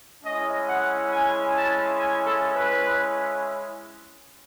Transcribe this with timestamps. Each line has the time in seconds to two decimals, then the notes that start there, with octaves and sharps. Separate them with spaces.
0.24 G#3 C#4 E4 D#5
0.67 F#5
1.11 G#5
1.54 A5
1.98 G#5
2.26 A4
2.55 B4